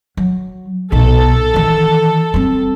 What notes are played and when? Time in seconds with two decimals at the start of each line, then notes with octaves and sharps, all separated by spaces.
0.17 F#3
0.92 B1 B2 A4
1.54 D#3 E3
2.34 G3 C4